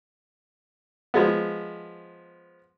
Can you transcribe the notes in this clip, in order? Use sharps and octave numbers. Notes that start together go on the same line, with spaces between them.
F3 G#3 B3